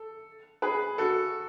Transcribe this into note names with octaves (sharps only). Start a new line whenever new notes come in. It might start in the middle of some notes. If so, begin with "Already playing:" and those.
Already playing: A4
G#4 B4
F#4 A4